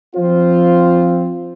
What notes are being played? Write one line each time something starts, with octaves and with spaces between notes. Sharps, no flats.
F3 C4 F4 C5